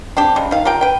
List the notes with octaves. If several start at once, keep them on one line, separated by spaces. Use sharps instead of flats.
C4 D4 G4
C#3 G3 G#3
D#3 F5
F4 G4 A#4 G5
B4 G5